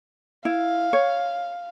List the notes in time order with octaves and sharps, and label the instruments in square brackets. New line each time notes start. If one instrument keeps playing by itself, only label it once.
[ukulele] E4 [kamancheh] F5
[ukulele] C#5